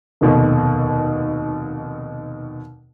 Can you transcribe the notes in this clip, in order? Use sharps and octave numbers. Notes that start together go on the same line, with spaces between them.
F1 D#2 B2